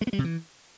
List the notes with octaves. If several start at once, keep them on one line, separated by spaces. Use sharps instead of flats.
G#3
B3
G3
C3
E3